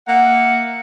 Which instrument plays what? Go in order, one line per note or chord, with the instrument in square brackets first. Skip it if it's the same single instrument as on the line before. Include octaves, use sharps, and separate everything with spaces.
[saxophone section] A#3 E5 F#5